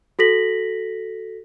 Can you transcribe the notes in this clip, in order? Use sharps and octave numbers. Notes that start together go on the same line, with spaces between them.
F#4 A4 A#6 B6 F#7